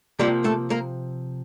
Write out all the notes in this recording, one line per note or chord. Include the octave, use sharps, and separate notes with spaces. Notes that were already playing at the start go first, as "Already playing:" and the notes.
C3 F3 G3 A#3 G4
A3 A4
A#3 A#4